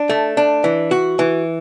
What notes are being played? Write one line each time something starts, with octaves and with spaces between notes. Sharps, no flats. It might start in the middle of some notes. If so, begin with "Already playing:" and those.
Already playing: D4
A3
D4
E3
F#4
E3